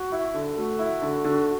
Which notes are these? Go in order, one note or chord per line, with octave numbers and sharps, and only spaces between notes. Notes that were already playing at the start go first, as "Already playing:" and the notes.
Already playing: F#4
E4
D3
A3 F#4
E4
D3
D3